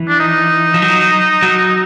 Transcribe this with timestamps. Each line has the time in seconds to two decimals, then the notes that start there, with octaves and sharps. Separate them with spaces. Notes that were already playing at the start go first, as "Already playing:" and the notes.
Already playing: E3
0.09 D4
0.19 D#4
0.74 F3
0.82 F#3
1.42 F#3